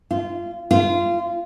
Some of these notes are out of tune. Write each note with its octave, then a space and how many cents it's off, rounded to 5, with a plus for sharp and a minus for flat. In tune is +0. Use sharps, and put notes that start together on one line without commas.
F4 -20
F4 -20